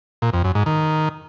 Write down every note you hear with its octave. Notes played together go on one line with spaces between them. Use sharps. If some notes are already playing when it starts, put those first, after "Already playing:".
A#2
F2
F#2
G#2
D#3